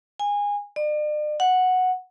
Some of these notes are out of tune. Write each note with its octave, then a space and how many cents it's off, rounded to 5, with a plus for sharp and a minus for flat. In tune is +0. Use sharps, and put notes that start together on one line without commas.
G#5 -25
D5 +40
F#5 -5